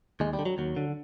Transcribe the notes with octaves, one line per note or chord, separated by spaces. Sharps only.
D#2 G#3
G3
D3
F#3
D#2 F#3
D3